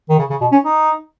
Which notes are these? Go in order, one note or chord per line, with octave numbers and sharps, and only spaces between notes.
D#3
C#3
C#3
B2
C#4
D#4